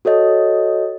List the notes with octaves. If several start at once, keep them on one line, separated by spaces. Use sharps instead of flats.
F#4 A4 C#5 D#5